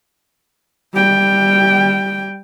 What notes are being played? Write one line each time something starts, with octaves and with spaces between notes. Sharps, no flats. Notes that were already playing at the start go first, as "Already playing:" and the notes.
G3 G5